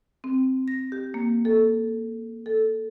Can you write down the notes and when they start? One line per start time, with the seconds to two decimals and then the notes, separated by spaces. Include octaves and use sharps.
0.24 C4
0.68 A#6
0.92 G4
1.14 A#3
1.45 A4
2.46 A4